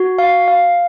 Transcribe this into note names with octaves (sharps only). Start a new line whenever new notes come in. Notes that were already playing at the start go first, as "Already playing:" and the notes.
Already playing: F#4
F5
F5